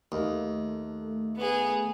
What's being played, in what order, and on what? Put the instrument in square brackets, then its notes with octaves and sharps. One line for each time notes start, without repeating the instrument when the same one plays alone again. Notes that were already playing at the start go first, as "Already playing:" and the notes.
[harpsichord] D#2 [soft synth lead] A3
[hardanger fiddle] B3 G#4